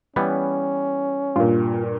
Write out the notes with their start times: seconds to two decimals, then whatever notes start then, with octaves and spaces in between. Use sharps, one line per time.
0.16 E3 G3 B3 C#4
1.36 G2 A#2 F4